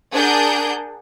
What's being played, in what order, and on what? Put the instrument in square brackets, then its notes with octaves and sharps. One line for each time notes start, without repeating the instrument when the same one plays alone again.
[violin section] D4 G#4 A#4 F#5 G6